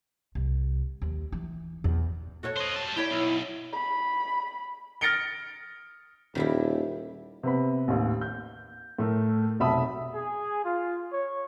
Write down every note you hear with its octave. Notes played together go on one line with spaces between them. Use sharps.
C2
D#2
E3
E2
F#4 A4 C#5
C5 D#5
G3 A5
E4 G4 C#5 D5
B1
B5
F6 A6 A#6 C#7 D7 G7
D#1 D#3 G3 E4
C3 B3 B5
A1 D#2
G6
A2 A3 A#4
F1 B1 E5 A5 B5 D#6
G#4
F4
C#5